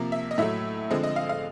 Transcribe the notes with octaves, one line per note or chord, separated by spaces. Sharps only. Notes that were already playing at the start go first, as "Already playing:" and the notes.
Already playing: C3 F3 A#3
E5
D#5
A2 F#3 A3 E5
D3 F3 G#3 C4 D#5
D#5
F5
F5